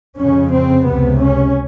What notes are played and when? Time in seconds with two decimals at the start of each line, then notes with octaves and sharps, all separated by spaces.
0.18 F2 C#3 C#4
0.52 C4
0.86 C#2 C3 B3
1.20 C#4